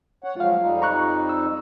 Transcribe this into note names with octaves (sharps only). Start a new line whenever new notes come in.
C#5 F#5
F3 F#3 G#3 F4 F5
F2 G3 D#4
A#5 C#6 F#6
E6